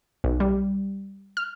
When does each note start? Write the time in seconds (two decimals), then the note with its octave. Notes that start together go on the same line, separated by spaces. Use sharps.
0.24 B1
0.40 G3
1.37 F6